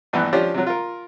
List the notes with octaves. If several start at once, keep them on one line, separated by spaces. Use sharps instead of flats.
A#1 G2 E3 B3
F3 C#4 D4 F4 G4
C3 F#3
F4 A#4